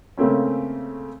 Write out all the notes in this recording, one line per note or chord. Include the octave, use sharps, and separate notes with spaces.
C#3 A3 A#3 C4 C#4